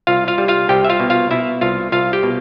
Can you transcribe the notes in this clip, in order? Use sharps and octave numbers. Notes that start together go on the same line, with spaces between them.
C2 F4 F5
F4 F5
G3
F4 F5
C2 G4 G5
E5
F4 F5
B2
F4 F5
B2 E4 E5
C2 F4 F5
C2 F4 F5
G4 G5
B2